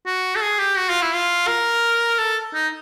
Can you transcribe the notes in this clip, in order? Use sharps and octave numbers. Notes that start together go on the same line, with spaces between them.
F#4
A4
G#4
G4
F#4
F4
E4
F4
A#4
A4
D#4